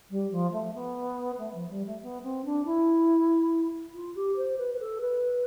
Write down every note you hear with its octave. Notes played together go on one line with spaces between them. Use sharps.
G3
F3
A3
B3
A3
F3
G3
A3
B3
C4
D4
E4
F4
G4
C5
B4
B4
A4
B4